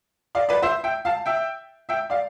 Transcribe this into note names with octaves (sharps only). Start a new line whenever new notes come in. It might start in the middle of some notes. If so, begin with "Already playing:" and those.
D5 F5
B4 D5
C5 E5
E5 G5
F5 A5
E5 G5
E5 G5
D5 F5